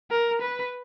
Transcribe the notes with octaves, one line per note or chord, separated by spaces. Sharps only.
A#4
B4